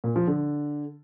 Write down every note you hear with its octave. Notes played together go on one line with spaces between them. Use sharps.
A#2
F3
D3